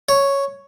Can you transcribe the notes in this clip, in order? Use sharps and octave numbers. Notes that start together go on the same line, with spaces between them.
C#5